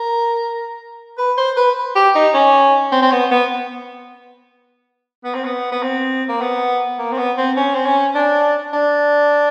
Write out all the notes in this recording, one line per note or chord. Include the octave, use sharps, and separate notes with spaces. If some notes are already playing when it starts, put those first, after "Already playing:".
Already playing: A#4
B4
C5
B4
G4
D#4
C#4
C4
C4
B3
B3
B3
C4
B3
B3
C4
A#3
B3
A#3
C4
B3
C4
C#4
C4
C#4
D4
D4